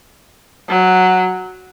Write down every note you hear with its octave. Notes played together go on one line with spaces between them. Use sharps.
F#3